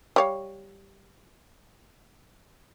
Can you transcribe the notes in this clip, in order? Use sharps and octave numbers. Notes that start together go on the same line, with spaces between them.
G3 C#5 F5